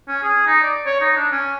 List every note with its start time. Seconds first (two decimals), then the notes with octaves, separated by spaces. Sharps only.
0.08 C#4
0.23 G#4
0.46 D#4
0.63 D5
0.86 C#5
1.01 D#4
1.17 D4
1.32 C#4